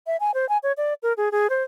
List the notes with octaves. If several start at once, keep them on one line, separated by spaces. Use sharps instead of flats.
E5
G#5
C5
G#5
C#5
D5
A#4
G#4
G#4
C5